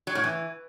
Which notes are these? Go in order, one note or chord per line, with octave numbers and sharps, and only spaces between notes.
F#3
A2
E3